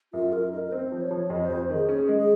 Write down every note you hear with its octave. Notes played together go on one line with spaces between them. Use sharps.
F#2 F4
F#2 A#4
D#4 A#4
A#4
C4 C5
F3
C#5
F3
F2 D#5
F2 C5
D#3 G#4
C#4 G#4
G#3
G#4